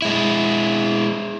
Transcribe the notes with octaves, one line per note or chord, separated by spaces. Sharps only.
G#3 E4